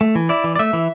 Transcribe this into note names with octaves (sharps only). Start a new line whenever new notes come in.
A3
E3
E4 D5
E3
D5
A3 E5
E3